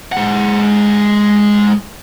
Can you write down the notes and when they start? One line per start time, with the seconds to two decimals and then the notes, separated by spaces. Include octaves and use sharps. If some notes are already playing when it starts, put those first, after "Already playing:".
0.12 G#3 F#5